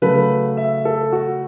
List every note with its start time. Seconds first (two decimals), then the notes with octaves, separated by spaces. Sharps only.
0.02 C#3 F#3 A3 B4
0.57 E5
0.85 A4
1.12 F#4